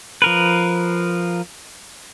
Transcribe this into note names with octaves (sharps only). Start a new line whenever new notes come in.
F3 A#4 B4